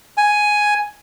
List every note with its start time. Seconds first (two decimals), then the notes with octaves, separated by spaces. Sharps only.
0.17 G#5